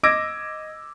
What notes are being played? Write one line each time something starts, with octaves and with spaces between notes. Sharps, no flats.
D#5 D6 E6 G#6 A#6 D7